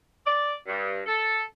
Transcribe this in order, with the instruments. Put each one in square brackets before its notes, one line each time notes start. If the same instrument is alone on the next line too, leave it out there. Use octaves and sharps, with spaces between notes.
[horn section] D5
G2
A4